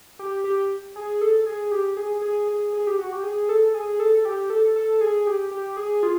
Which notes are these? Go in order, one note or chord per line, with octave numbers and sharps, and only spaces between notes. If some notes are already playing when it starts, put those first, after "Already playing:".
G4
G4
G#4
A4
G#4
G4
G#4
G#4
G#4
G#4
G4
F#4
G4
G#4
A4
G#4
A4
G4
A4
A4
G#4
G4
G4
G#4
F4